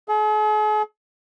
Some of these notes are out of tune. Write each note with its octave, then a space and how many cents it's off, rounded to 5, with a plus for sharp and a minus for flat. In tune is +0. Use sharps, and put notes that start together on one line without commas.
G#4 +45